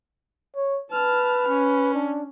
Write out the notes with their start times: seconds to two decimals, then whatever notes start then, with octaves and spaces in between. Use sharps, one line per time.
0.56 C#5
0.92 B4 A5 F6
1.49 C#4
1.94 D4